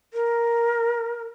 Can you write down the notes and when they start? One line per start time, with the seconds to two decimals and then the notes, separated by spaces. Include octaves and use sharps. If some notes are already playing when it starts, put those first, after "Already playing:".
0.14 A#4